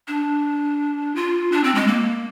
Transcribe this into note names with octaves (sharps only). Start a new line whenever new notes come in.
D4
F4
D4
C4
G#3
A#3